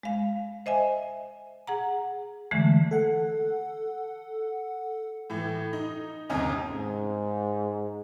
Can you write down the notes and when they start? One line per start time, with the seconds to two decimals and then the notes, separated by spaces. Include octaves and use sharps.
0.03 G#3 F5
0.66 C5 D#5 E5 G#5
1.67 G#4 F#5 A#5
2.51 D3 E3 G#3 A3
2.91 A4 F#5
5.30 A2 E3
5.73 D#4
6.30 G1 D#2 C3 C#4 D#5 A#5
6.72 G#2